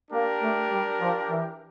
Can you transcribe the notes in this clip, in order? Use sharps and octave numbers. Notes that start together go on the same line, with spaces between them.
A#3 D4 G4 A#4
A3
G3
F3
E3